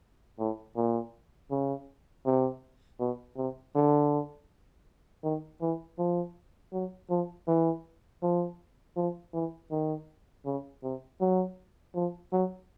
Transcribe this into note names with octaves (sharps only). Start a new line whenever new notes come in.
A2
A#2
C#3
C3
B2
C3
D3
D#3
E3
F3
F#3
F3
E3
F3
F3
E3
D#3
C#3
C3
F#3
F3
F#3